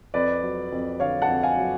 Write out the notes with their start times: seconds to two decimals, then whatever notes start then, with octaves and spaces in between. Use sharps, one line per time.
0.14 F2 B4 D5
0.43 F#3
0.72 F2
1.00 D3 C#5 F5
1.22 F#5 A5
1.28 F2
1.43 F5 G#5
1.57 F#3